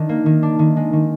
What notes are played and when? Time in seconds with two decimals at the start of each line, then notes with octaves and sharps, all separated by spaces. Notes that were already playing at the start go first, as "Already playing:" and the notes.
Already playing: D#3 D4
0.09 A#3
0.26 D#3
0.43 D4
0.59 D#3
0.77 G#3
0.93 D#3